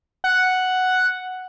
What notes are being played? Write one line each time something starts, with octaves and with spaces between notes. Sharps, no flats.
F#5